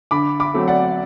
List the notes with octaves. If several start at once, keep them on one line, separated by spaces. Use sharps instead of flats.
D3 B5 D6
B5 D6
F#3 A3 C4
D5 F#5